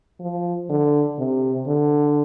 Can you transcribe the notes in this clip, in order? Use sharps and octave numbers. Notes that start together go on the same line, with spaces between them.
F3
D3
C3
D3